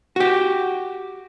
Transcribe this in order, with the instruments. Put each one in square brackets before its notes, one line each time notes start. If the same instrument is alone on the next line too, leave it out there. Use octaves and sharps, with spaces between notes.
[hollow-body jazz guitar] F#4 G4